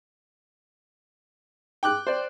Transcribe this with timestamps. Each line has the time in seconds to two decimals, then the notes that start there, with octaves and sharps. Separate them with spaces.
1.83 G5 D6 F#6
2.07 C5 D5